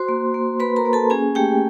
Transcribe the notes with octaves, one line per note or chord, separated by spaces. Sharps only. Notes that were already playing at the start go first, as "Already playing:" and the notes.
Already playing: F#4 C5 C6
A#3
A#3
A#3 B4 B5
A#4 A#5
A#3
A4 A5
C#4 G#4 G#5
A3 G4 G5